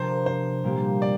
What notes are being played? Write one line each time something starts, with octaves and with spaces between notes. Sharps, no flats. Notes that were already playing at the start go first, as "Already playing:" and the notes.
Already playing: C3 F3 D4 A#4 C5
C5
A#2 G3 A#3 G4
D5